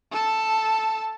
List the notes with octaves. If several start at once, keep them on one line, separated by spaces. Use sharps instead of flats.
A4 A5